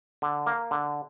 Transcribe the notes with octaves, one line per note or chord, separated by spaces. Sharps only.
D3
A#3
D3